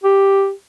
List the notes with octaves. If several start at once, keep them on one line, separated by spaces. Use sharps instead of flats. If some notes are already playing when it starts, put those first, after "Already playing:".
G4